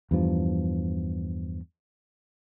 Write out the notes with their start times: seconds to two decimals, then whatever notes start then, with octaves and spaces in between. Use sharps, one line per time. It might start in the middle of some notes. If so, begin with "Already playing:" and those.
0.11 E2 G2 F3